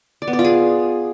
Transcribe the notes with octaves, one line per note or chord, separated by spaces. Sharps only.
D5
B3
D5
F4
G#4